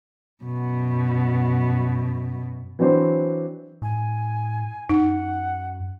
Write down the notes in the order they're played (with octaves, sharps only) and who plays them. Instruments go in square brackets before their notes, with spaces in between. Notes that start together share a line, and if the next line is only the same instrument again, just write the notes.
[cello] F#2 B2
[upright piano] E3 F#3 C4 D4 C5
[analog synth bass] A2 [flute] G#5
[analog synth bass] F#2 [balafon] D#4 [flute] F#5